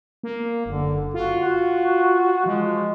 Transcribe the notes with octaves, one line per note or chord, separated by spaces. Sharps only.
A#3
F#1 D3
F4 F#4
F#4
F3 G#3